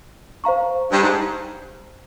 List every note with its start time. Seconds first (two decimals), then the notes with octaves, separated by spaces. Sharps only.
0.44 C5 F5 A#5 C#6
0.92 G2
1.02 G#2